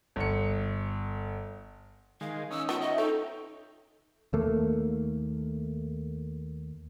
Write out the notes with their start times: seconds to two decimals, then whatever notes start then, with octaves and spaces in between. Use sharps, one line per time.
0.16 G1 C#7
2.21 D#3 G#3 F5
2.51 C#4 D#4 E6
2.69 B3 F4
2.81 D#5 E5
2.98 D#4 F4 A4 C#5 G5
4.33 D#2 A3 A#3